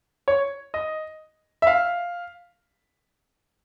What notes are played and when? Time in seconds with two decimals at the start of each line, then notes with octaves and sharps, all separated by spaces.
0.28 C#5
0.74 D#5
1.62 E5
1.67 F5